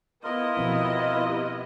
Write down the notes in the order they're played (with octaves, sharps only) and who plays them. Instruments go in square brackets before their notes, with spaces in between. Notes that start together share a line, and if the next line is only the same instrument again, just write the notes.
[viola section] B3 E4 D#5 [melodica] F4 A#4
[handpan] B2 F3 C4
G4